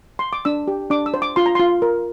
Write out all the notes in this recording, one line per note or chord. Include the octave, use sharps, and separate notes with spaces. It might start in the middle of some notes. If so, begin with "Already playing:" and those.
C6
D6
D4 E6
G4
D4 D6
E6
C5
D6
F4 C6
A#5
F4 C6
A#4